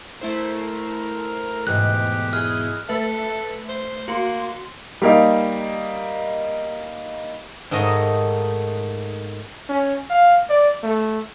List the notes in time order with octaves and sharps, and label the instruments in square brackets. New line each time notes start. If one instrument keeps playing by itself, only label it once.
[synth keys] A3 E4 C5 [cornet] A#4
[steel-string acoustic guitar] E2 G#2 B2 [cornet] G4 [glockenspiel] F#6
[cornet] E4 [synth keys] G#4 D#5 [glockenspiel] F6
[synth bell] A3 B4 E5 [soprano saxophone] A4
[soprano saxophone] C5
[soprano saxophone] A#3 [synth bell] F#4 C6
[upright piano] G3 A#3 D#4
[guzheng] G#2 D#3 A3 D#5
[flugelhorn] C#4
F5
D5
A3